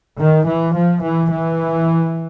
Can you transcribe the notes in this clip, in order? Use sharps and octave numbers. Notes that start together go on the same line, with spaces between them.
D#3
E3
F3
E3
E3